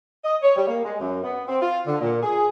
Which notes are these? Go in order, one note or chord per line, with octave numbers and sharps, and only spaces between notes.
D#5
C#5
G3
A#3
G#3
F#2
B3
C4
F4
D3
A#2
G#4